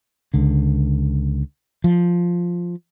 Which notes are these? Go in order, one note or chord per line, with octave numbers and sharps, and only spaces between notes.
C#2 D3
F3